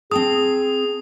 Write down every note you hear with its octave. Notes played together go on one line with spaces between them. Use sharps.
C4 G#4 G5 A5 D#6